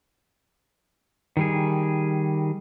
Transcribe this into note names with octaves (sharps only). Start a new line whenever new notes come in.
D#3 G3 G#4